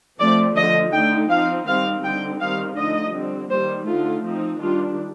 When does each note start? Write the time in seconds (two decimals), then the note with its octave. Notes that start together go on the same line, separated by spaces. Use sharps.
0.19 F3 A3 C4 D5
0.56 D3 F3 A3 D#5
0.93 D3 A3 D#4 G5
1.30 F3 C4 D#4 F5
1.66 D#3 G3 C4 D#4 F5
2.03 D3 G3 C4 D#4 G5
2.40 D#3 G3 C4 D#4 F5
2.77 D3 F3 A3 D#4 D#5
3.13 D3 G3 C4
3.50 D#3 G3 A#3 C5
3.87 D3 A3 D#4 F4
4.23 F3 C4 D#4
4.60 D#3 G3 D4 F4